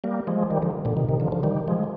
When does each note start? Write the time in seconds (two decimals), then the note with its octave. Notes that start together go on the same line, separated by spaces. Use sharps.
0.04 G3 A#3
0.27 F3 G#3
0.50 D#3 G3
0.62 D3 F3
0.85 A#2 D3
0.97 C3 D#3
1.09 C3 D#3
1.20 D3 F3
1.32 D3 F3
1.43 D#3 G3
1.68 F3 G#3